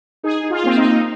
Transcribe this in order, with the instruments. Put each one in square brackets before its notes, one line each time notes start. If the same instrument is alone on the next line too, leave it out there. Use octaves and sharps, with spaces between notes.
[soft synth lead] D#4 [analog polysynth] G#4
[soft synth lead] D#4
[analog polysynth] F4
[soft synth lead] A#3 [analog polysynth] C4
[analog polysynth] D#4
[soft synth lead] A#3